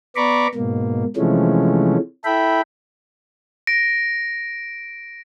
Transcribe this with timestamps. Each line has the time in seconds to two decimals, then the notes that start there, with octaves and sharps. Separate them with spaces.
0.16 B3 D5 A#5 B5 C#6 D6
0.55 G#2 B2 A#3
1.17 C3 E3 F3 G#3 A3 C#4
2.25 E4 A4 E5 G5 B5
3.67 A#6 D7